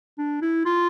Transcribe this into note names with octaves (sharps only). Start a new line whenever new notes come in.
D4
E4
F4